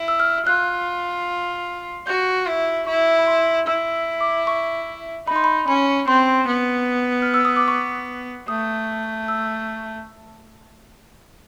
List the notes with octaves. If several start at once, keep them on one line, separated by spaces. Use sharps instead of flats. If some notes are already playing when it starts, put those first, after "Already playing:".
Already playing: E4
E6
F6
F4 F#6
F#4 G6
E4
E4 C#6
B5
C6
E4 E6
D6
C#6
D#4 B5
C6
B5
C#4 B5
C4 C6
B3
F6
E6
D#6
D6
C#6
A3 D#6
E6